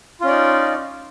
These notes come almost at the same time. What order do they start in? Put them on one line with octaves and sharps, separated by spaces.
F4 C#4 D5 D#4